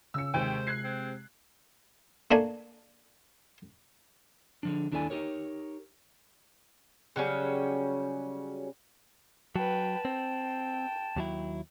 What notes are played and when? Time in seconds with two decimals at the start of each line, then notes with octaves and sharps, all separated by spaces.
0.14 C#3 E6 C#7
0.34 D#2 C3 G#3 C5 G5
0.67 F#6 G#6 C7
0.84 C4
2.31 A3 A#3 D4 G#5
4.63 D3 F3 D4
4.92 D#2 D4 E4 A4 D5 G#5
5.10 D#4 G4 A#4 C#5
7.16 C#3 F#3 G3 C#4
9.56 F#3 B4 G5 A5
10.05 C4 G5
11.16 D#2 F#3 E4